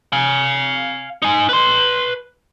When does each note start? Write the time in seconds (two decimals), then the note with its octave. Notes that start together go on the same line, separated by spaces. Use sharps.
0.13 F5 G#5
1.22 D#4 G#5
1.49 B4 C6